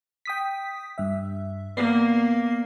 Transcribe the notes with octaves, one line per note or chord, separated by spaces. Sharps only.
G5 D#6 B6
G2 E5
A#3 B3 D5 C7